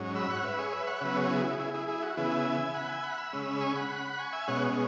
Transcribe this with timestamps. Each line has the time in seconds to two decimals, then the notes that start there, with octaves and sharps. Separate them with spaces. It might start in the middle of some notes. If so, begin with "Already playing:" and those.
Already playing: G#2 F#3 C#4
0.15 B5 E6
0.30 C#5 F#5
0.44 B4 E5
0.58 G#4 C#5
0.73 B4 E5
0.87 C#5 F#5
1.01 C#3 F#3 B3 B4 E5
1.16 G#4 C#5
1.30 E4 G#4
1.45 E4
1.59 E4 G#4
1.74 E4 G#4
1.88 E4 G#4
2.03 F#4
2.17 C#3 E3 B3 E4 G#4
2.31 E5 G#5
2.74 F#5 B5
2.89 E5 G#5
3.03 F#5 B5
3.18 B5 E6
3.33 C#3 G#3 C#4
3.61 G#5 C#6
3.75 F#5 B5
4.18 G#5 C#6
4.33 E5 G#5
4.48 B2 G#3 C#4 C#5 F#5